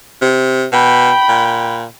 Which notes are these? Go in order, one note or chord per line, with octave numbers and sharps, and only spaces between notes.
C3
B2 G5 B5
A#2